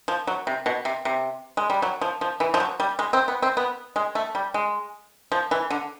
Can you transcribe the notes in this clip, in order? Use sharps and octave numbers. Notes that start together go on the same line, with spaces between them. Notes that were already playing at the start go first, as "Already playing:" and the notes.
F3
F#3
C3
B2
C3
C3
G#3
G3
F#3
F3
F3
E3
F3
F#3
G3
G#3
C4
B3
C4
B3
G#3
A3
G3
G#3
F3
E3
D3